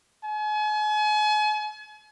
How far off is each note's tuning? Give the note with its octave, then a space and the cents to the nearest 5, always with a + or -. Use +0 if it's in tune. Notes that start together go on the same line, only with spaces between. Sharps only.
G#5 +40